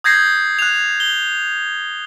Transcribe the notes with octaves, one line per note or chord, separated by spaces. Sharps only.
D#6 G6 G#6 A#6 C7
F#6 F7
G7